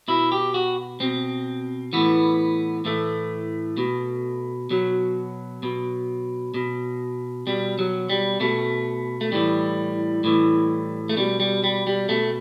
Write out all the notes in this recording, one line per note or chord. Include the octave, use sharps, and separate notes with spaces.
B2 E4
G4
F#4
B2 C4
A2 E3 B3
A2 E3 A3
B2
B2 F#3
B2
B2
B2 G3
F#3
G3
B2 A3
A3
A2 E3 G3
A2 E3
A3
B2 G3
G3
G3
G3
B2 A3